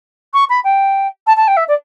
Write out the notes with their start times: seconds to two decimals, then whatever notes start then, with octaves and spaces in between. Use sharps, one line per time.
0.33 C#6
0.49 B5
0.64 G5
1.26 A5
1.36 A5
1.47 G5
1.56 E5
1.68 D5